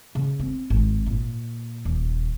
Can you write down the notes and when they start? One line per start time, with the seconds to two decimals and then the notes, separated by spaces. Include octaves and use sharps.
0.15 C#3
0.40 C4
0.70 G#1
1.06 A#2
1.85 D#1